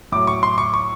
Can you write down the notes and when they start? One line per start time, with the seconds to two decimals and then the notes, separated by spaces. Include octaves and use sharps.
0.12 A2 F#3 D6
0.27 C#6
0.43 C6
0.58 C#6
0.74 C#6